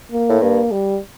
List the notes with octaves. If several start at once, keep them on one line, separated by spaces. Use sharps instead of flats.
A#3
A2
G2 A#3
G3